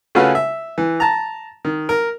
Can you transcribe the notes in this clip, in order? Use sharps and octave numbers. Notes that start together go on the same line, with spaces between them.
C#3 A3 C#4 F4 F#4 B4
E5
E3
A5 A#5
D#3
A#4